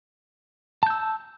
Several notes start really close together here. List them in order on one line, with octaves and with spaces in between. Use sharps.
A5 G6 E6